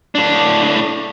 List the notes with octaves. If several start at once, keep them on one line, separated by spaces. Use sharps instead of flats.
A2 D4